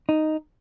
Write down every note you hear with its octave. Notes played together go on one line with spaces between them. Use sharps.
D#4